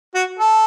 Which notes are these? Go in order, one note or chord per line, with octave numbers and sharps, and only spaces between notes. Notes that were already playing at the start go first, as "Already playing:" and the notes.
F#4
A4